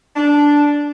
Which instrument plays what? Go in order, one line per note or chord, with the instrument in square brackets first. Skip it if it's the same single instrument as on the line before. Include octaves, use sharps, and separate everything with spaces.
[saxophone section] D4